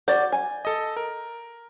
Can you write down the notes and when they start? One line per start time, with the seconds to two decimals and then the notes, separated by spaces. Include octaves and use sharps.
0.08 F#4 D5 G6 A6
0.32 G#5
0.65 A4 D#5
0.97 A#4